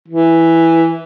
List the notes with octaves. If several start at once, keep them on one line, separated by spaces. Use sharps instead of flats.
E3